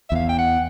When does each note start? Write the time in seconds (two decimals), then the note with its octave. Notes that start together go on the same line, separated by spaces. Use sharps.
0.09 E5
0.12 E2 F5
0.29 G5
0.38 F#5